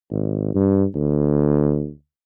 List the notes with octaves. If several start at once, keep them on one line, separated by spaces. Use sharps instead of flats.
G#1
G2
D2